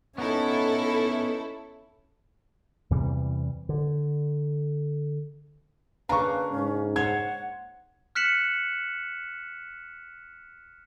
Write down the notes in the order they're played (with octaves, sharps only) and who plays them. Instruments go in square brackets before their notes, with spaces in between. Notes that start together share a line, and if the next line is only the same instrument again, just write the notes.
[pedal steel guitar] B3 D#4 [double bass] C#4 [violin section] E4 A4
[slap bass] E2 C3 E3 G3
D3
[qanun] C#3 A#3 D4 [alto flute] B4 [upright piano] A#5 C#6
[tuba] G#2 [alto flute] C#4
[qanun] C5 C#5 [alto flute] F#5 [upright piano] G#6
[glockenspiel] F6 F#6 B6 C#7 E7 F#7